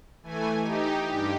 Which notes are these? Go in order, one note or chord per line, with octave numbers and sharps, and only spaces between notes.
E3 A3 G#5
D#4 G4
G2 G4